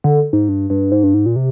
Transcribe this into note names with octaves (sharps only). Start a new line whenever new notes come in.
D3
G#2
G2
G2
G#2
G2
G#2
A#2
C3